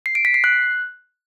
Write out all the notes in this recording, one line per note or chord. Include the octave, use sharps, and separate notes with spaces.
C7
D7
B6
C7
F#6